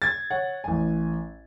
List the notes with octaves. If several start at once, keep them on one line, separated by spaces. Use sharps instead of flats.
G#6 A6
C#5 F#5
A1 G#5